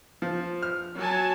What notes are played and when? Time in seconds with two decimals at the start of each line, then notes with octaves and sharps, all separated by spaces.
0.22 F3
0.63 F6
0.97 F#3 G#5 A5